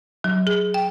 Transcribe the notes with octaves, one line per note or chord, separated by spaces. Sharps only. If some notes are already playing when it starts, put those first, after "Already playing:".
F#3
G#4
G5